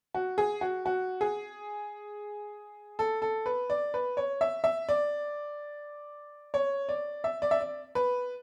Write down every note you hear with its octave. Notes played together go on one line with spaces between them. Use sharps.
F#4
G#4
F#4
F#4
G#4
A4
A4
B4
D5
B4
C#5
E5
E5
D5
C#5
D5
E5
D5
E5
D5
B4